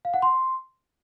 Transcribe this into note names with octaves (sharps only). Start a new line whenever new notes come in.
F5
F#5
C6